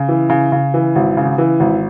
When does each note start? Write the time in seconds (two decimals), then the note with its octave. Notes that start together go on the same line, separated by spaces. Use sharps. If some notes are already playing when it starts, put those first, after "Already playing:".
Already playing: C#3
0.09 E3
0.30 C#3
0.52 C#3
0.74 E3
0.96 G#1
1.17 C#3
1.38 E3
1.60 G#1